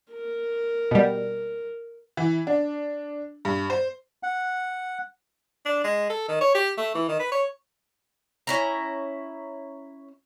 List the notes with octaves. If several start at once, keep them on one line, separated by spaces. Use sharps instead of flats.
A#4
B2 G3
E3
D4
G2
C5
F#5
D4
G#3
A4
D#3
C#5
G4
A3
E3
D#3
B4
C#5
C#4 E4 A#5